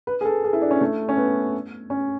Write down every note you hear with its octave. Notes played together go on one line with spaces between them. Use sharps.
B4
G#4
A4
G#4
E4
D4
C#4
A3
C#4
B3
C#4